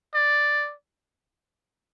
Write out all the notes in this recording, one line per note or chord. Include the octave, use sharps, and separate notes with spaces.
D5